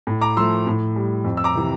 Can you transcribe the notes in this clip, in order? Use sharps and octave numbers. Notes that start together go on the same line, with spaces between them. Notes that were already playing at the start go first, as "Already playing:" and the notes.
A2
A#5 D6
F3 A3 C6 E6
A2
G3
F2
E6
A#5 D6
C3 E3